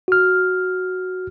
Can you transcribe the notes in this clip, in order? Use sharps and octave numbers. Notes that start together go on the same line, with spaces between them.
F#4 F6